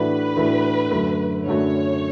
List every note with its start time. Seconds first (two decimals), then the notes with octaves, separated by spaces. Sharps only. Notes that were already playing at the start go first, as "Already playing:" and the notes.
Already playing: A2 E3 A3 D4 F#4 B4
0.37 A2 E3 A3 D4 F#4
0.91 F#2 D3 F#3 A3
1.46 F#2 D3 F#3 A3 C#5